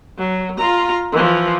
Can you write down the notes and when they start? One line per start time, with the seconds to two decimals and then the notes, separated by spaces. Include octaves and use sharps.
0.18 F#3
0.58 F4 A#5
1.13 E3 F3